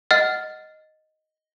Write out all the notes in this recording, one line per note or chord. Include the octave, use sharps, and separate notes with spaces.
D#5 F#5 F6 A6